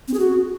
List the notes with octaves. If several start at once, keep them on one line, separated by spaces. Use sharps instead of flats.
C4
G#4
F#4